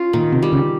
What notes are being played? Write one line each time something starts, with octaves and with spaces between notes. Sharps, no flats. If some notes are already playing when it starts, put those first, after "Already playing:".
Already playing: C#4 F4
A#2 D#3
C3
G3
C#3